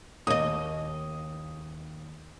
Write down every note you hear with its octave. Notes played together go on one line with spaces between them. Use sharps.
D#2 D#5 D#6